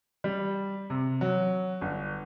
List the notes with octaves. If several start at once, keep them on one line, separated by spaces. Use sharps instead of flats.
G3
C3
F#3
G1